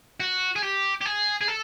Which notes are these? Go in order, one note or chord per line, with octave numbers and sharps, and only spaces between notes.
F#4
G#4
G4
G4
G#4
G#4
A4